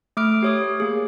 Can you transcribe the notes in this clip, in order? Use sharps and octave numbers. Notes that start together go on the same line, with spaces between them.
A3 D6 F6 D7
G4 C#5 D#6
A#3 G#4